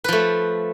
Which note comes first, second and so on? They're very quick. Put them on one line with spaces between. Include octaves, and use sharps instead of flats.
B4 F3 A3